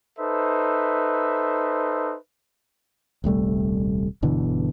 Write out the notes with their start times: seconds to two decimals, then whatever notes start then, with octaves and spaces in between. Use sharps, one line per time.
0.19 D#4 A4 B4 C5 E5
3.24 D#1 C2 G3 A3
4.22 G1 B2 D3 E3